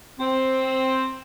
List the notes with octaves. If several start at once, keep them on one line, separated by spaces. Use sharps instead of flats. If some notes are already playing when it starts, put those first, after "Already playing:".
C4